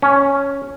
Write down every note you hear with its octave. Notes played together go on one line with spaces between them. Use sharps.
C#4